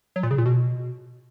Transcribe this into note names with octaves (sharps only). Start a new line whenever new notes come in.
F#3
A#2
C#3
A#2
B2